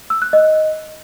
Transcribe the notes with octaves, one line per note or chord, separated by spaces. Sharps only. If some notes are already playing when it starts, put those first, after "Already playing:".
E6
F#6
D#5